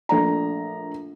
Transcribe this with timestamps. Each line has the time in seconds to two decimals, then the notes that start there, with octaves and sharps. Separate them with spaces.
0.09 A#1 A3 D5 A#5